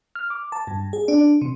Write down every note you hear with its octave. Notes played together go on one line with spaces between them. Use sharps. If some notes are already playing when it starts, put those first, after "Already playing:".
F6
D6
A5
G2
G#4
D4
C3